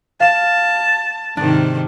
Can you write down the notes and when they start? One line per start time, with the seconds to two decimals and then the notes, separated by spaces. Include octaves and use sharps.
0.20 F5 A5 E7
1.37 G#2 C3 D#3 D4